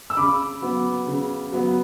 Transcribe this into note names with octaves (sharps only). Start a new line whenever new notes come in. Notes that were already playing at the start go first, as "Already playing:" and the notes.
E6
C#3 B5 D6
F#3 B3
C#3
F#3 B3